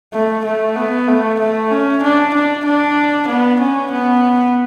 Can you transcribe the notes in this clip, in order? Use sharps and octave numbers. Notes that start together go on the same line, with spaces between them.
A3
A3
B3
A3
A3
C#4
D4
D4
D4
B3
C#4
B3